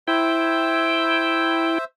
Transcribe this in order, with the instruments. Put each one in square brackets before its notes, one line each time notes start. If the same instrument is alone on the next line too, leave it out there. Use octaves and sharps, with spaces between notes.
[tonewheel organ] E4 G5 [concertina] C5 E5